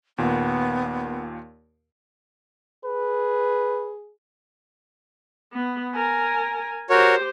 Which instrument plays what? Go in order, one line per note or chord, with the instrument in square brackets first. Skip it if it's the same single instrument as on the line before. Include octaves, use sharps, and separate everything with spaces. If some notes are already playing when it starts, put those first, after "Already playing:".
[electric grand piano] D#2 A#2 [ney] B3
[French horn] G#4 [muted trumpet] B4
[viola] B3
A#4 G#5
[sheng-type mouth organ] F#4 A#4 C#5 [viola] G4 C5